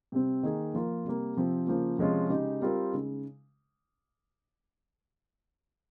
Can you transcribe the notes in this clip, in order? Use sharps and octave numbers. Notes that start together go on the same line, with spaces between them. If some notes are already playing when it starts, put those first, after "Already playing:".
C3 G3 C4
D#3 A#3 D#4 G#4
F3 A#3 F4 A#4
C3 G3 A#3
C3 F3 C4
C#3 F3 A#3 F4
C3 F3 G#3 C#4 F4
C#3 G#3 D#4 G4
G3 C4 F4 A#4
C#3 G#3 D#4